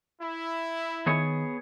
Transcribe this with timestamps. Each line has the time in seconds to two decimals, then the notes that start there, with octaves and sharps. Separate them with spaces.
0.21 E4
1.06 D#3 B3 G#4 C#5